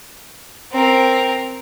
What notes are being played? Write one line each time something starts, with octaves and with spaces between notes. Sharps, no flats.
C4 A#4